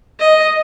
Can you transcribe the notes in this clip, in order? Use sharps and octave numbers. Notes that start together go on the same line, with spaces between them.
D#5